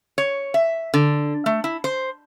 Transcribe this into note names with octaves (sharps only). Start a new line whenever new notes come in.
C#5
E5
D3
A3
E4
C5